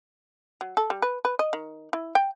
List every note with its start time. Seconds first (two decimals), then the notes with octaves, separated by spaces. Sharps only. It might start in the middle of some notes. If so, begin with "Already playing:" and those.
0.61 F#3
0.77 A4
0.90 G3
1.02 B4
1.25 B4
1.39 D#5
1.53 D#3
1.93 E4
2.15 G5